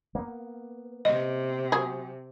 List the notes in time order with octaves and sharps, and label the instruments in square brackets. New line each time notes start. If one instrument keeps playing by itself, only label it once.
[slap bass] A#3 B3
[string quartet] C3 [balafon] D#5
[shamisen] F#3 G#4